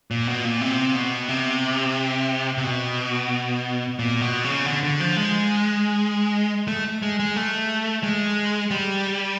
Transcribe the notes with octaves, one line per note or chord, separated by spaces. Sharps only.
A#2
B2
A#2
C3
B2
C3
C3
B2
A#2
B2
C#3
D3
D3
F3
G#3
A3
G#3
G#3
A3
G#3
G3